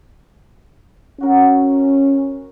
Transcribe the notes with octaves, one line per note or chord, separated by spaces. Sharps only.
C#4 F#4 A#4